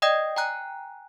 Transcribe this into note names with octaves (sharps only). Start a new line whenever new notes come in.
D5 D#5 G5 D#6 G#6 A#6
G5 G#5 A#5 F#6